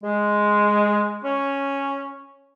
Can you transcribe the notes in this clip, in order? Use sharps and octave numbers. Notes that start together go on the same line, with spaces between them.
G#3
C#4